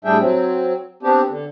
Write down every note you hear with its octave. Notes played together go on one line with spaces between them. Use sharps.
A2 G3 D4 G#4 E5 G5
F#3 C4
B3 C4 D4 G4
D3